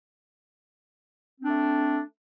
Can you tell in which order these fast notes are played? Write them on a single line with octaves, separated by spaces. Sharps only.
C4 D4 A3